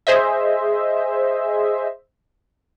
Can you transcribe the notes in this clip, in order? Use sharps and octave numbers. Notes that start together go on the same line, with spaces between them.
G#4 C5 D#5 E5